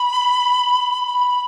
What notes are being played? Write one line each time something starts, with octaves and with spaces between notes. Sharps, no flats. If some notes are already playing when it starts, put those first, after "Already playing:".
Already playing: B5
B5